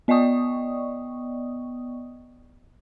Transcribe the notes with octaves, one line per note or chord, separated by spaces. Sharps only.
B3 D5 D#5 G5 C#6 D#6